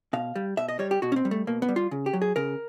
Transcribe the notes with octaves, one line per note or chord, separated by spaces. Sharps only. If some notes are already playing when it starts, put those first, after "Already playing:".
B2 F5
G3
B2 E5
D#5
G3 C#5
G4
B2 F#4
C#4
C4
G3
A3
B2 A#3
B3
G3
F4
C#3
G4
F#3
G#4
C#3 A#4